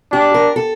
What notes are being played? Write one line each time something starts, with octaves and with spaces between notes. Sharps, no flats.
D4 G4
A#4
A4